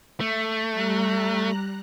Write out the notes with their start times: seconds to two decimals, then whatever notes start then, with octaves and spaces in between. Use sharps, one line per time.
0.21 A3
0.72 G3 A#5 F#6